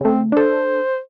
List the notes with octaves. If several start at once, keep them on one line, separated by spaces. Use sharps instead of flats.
C#3 A3 C4
D4 A4 C5